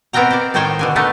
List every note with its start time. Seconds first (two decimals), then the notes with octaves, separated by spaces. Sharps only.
0.13 B2 B3 C4 A#4 G5 A#5
0.31 C5 D5
0.54 A2 D#3 D#4 C5 C#5 G5
0.79 B2 D3 G#5
0.96 D3 A3 B3 D#4